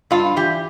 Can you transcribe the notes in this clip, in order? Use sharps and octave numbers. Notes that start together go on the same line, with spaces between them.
G2 F4
E3 G4